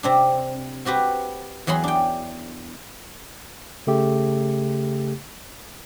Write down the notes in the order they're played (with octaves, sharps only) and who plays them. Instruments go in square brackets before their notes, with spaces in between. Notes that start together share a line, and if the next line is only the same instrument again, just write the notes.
[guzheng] C3 C4 D4
C4 F#4 G4 B4 C5
E2 F#3 G#4 B5 C6
D4 G5
[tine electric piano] C#3 A3 G4